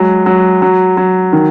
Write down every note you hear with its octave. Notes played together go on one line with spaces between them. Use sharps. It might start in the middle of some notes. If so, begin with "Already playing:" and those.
Already playing: F#3 G#3
F#3
F#3
F#3
D#3